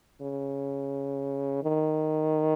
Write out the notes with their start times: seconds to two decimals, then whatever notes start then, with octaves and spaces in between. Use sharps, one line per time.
0.22 C#3
1.63 D#3